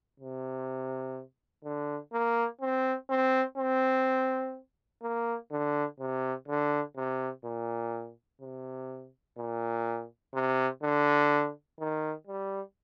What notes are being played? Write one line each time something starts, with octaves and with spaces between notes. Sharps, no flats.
C3
D3
A#3
C4
C4
C4
A#3
D3
C3
D3
C3
A#2
C3
A#2
C3
D3
D#3
G3